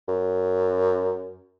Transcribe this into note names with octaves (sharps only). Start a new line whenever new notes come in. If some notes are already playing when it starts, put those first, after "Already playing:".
F#2